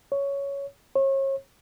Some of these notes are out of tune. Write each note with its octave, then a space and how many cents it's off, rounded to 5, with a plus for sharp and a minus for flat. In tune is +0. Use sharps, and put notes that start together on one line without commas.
C#5 +5
C#5 -40